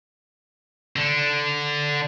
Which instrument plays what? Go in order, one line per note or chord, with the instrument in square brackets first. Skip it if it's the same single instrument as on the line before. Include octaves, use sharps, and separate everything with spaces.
[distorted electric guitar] D3